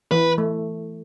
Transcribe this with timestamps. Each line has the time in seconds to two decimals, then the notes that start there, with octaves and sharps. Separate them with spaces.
0.11 E3 B4
0.38 A3